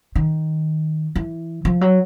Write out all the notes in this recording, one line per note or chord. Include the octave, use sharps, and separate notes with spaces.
D#3
E3
F3
F#3